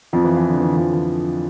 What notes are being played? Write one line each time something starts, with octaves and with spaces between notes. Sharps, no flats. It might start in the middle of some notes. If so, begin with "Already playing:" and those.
F2 F3
E3
E3
D3
E3
F2 F3
E3